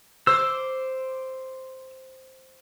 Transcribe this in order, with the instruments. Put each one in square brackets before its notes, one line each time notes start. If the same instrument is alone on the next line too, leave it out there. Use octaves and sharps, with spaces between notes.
[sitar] C5 [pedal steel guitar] D6 E6